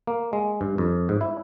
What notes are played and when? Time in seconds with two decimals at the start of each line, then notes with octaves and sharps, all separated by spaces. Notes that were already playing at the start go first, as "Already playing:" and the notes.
0.07 A#3
0.33 G#3
0.61 G2
0.78 F2
1.09 G#2
1.21 E4